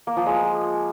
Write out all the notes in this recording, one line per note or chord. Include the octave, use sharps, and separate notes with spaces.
A#3
F3
G#3